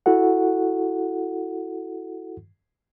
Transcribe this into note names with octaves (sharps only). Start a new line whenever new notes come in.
E4 F#4 A4 F#5